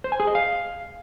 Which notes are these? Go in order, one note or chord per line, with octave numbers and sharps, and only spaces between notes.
C5
G#5
G#4
D#5
F5